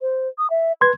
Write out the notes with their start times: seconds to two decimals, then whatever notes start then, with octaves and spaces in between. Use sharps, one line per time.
0.01 C5
0.38 D#6
0.50 E5
0.81 B4 C6 G#6